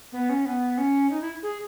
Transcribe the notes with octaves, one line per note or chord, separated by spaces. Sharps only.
B3
C#4
B3
C#4
D#4
E4
G#4